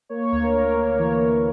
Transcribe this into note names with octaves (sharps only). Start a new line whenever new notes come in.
A#3 C#5
D2
A#4
A#3
A#3 C#5
E3
E3